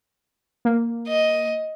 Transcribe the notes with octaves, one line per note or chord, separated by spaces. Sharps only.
A#3
D#5